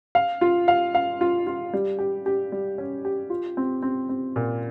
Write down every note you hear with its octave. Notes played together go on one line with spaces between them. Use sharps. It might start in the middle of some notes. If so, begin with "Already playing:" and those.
F5
F4
F5
F5
F4
F4
G3
G4
G4
G3
C#4
G4
F4
C4
C4
C4
A#2